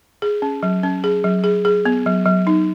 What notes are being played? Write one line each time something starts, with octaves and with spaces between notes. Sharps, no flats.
G#4
C#4
F#3
C#4
G#4
F#3
G#4
G#4
B3
F#3
F#3
D#4